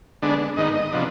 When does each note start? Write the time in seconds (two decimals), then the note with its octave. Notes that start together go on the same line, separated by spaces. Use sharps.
0.22 D3 G#3 B3 D4
0.57 G#2 D#3 B3 D#4 D#5
0.75 D#5
0.92 C3 F3 B3 D4